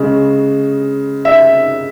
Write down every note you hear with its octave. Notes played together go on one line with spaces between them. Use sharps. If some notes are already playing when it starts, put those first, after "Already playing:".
Already playing: C#3 G#3
E5